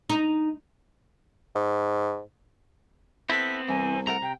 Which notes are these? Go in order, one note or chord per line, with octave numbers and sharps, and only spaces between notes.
D#4
G#2
B3 C4 E4 A4 B4 B6
C2 E3 G#5
C3 A3 A#4 F#5 A#5
C3 G5